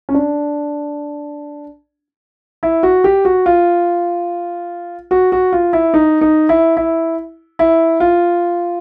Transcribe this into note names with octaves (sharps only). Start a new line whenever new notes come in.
C#4
D4
E4
F#4
G4
F#4
F4
F#4
F#4
F4
E4
D#4
D#4
E4
E4
E4
F4